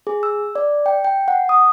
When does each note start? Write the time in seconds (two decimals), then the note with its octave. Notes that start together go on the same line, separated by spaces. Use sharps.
0.07 G#4
0.23 E6
0.55 D5
0.86 G5
1.04 G5
1.28 F#5
1.49 D#6